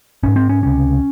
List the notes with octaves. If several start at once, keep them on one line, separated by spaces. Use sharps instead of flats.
G#1 G#2 C#4
C4
C#4
C#2 C3 C#4